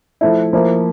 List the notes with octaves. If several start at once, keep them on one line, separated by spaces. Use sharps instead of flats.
F3 A3 E4
F3 A#3 E4